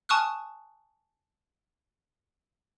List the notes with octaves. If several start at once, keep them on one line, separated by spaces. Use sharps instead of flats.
G#5 A5 C#6 D#6 F6 F#6